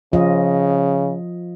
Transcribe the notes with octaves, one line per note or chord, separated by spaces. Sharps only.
C#3 F3 F4 D#5